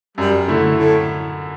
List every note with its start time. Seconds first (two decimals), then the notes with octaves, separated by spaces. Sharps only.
0.18 F#2 G3
0.48 D3 A3 E4
0.78 A2